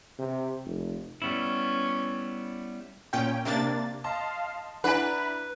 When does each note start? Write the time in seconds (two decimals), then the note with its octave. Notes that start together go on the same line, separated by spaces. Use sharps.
0.19 C3
0.65 F1
1.22 G3 B3 C#4 E4
3.13 A#2 C#4 G5
3.45 C3 A#3 D4 A6
4.04 D#5 F5 A5 C6
4.84 D4 E4 B4 F#5 G#5 A#5 B5